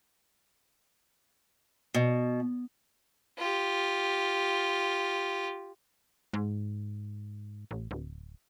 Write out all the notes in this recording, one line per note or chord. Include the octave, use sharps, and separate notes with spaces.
B2
F4 G4
G#2
A1
D1